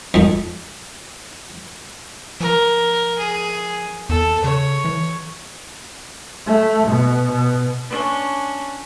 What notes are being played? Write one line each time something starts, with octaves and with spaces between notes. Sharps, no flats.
F2 G#2
F3 A#4
G#4
E2 A4
C#3 C#5
E3
A3
B2
B2
C#4 D4